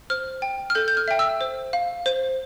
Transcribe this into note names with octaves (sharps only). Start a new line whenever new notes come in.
C5 F6
G5
F6
A4 G6
G6
F6
E5 G5
E6
C5
F5
C5